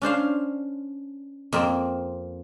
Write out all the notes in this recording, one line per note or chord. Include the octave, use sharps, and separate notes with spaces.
C#4 D4 C5 F5
F2 A#3 C4